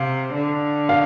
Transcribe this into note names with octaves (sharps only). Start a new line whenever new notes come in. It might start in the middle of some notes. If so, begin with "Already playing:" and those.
Already playing: C3 F5
D3
F5